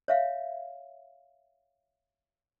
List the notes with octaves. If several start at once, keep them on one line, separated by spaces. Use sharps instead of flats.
C#5 E5 F5